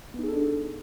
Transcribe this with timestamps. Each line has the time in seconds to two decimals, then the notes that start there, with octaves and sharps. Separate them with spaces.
0.14 B3
0.19 D#4
0.23 G#4
0.28 A4
0.33 D4